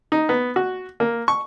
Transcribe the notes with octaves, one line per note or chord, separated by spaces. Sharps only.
D#4
B3
F#4
A#3
C#6